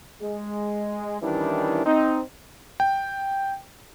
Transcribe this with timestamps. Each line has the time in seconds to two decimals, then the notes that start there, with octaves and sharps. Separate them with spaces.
0.21 G#3
1.22 D#3 E3 G3 C#4 D4 E4
1.86 C4 D#4
2.80 G5